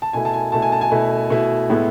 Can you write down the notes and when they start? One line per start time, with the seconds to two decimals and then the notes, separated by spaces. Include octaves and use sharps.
0.02 A5
0.13 B2 A3 E4 G#5
0.25 A5
0.33 G#5
0.52 B2 A3 E4 A5
0.62 G#5
0.72 A5
0.81 G#5
0.91 B2 A3 E4
1.30 B2 A3 E4
1.70 A2 G#3 B3 E4